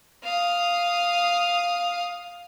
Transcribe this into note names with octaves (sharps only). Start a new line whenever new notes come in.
F5 D#6